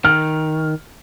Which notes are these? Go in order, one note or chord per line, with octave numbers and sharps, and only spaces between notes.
D#3 F6